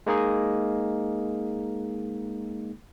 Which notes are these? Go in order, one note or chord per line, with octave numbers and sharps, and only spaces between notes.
G#3 A#3 D#4 G#4